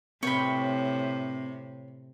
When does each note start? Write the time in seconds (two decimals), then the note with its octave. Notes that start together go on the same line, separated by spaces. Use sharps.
0.23 A2 C3 C4 B4 C#5 E5 G5 B5